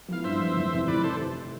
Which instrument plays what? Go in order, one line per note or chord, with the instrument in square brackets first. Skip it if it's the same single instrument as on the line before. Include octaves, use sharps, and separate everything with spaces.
[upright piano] F3 B3 E4 [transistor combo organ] F5
[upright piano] G2 [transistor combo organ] C5 E5
[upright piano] F3 B3 E4
F1
F2 C3 E3
[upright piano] F1 [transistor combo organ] B4 D5
[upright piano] C3 E3 [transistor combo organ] A4 C5